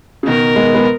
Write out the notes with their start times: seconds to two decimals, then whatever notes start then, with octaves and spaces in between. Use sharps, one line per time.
0.23 C#3
0.27 B2 D#3 A#4
0.56 G#3 B3
0.75 G#3 B3